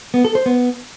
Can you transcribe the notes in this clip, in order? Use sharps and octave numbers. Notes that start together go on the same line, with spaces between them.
B3
A4
C5
B3